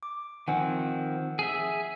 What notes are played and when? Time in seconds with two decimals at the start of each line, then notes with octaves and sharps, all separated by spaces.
0.03 D6
0.48 D#3 F3 C4 F#5 G#5
1.39 G#4 E5